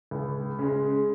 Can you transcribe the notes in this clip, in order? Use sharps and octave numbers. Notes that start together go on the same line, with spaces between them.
C#2
C#3 G#3